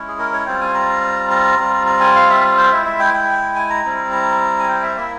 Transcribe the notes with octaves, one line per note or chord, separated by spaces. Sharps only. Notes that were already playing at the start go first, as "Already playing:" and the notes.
Already playing: G#3 C#4 E4
G#4
A#4
C#5
G3 C4 F4 G5
G#5
A#5
A#5
G3 C4 F4
A#5
G#5
F5
E5
C5
G#3 E4 E5
E5
G5
G5
G#5
A#5
G3 C4 E4
A#5
G#5
G5
E5
A#3 E4 E5